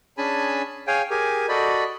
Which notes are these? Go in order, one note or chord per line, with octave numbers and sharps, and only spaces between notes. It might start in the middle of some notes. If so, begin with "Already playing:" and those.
C#4 D4 G#4 G#5 A5 B5
G#4 C#5 F5 G5 G#5
G4 G#4 A#4 G#5
F#4 A4 D5 D#5 B5